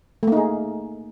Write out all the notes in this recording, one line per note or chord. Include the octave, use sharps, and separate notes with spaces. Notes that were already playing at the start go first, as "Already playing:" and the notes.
A3 A#3 D#4 G#4